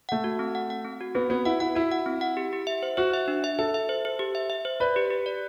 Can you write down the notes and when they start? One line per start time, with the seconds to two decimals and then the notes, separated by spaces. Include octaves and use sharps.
0.09 A3 F#5
0.24 F#4
0.39 C4
0.55 F#5
0.70 F#5
0.85 C4
1.01 F#4
1.15 B3 C4
1.30 B3 F#4
1.46 E4 F#5
1.60 E4 F#5
1.75 E4 F#4
1.91 F#5
2.06 C4
2.21 F#5
2.37 G4
2.53 G4
2.67 E5
2.83 C5
2.97 F#4 C5
3.14 E5
3.28 D4
3.44 E5
3.59 A4 E5
3.74 E5
3.89 C5
4.05 C5
4.19 G4
4.35 E5
4.50 E5
4.65 C5
4.80 B4 D5
4.96 G4
5.10 G4
5.26 D5